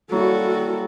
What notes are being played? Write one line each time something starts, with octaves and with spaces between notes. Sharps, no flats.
F#3 G3 A#3 E4 F#4 A4